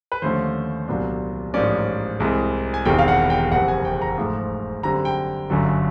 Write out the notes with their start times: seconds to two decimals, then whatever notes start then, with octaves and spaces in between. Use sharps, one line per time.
0.12 B4
0.22 D#2 D3 F3 A3 C#4 C5
0.88 C2 A#2 F#3 B3 D4
1.54 A1 G#2 F3 A#3 C#4 D5
2.20 C2 C3 E3 G#3
2.74 G#5
2.85 E1 E2 C3 D#3 G3 G5
2.98 F5
3.08 F#5
3.30 G5
3.51 F#1 F2 C3 F#5
3.68 G#5
3.85 G5
4.02 A#5
4.18 G#2 F3 A3
4.83 F#2 D3 G3 C4 A#5
5.05 G5
5.50 G1 F#2 D3 F#3